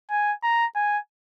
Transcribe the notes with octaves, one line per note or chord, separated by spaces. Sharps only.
G#5
A#5
G#5